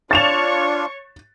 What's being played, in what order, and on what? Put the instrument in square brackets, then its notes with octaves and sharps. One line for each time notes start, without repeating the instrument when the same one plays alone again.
[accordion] D4 F4 [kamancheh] C#5 C#6 [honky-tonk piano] A6 E7 F7